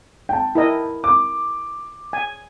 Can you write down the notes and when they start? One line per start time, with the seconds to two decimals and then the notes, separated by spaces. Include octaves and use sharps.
0.29 G5 A5
0.55 E4 A#4 D#5
1.04 D6
2.13 G#5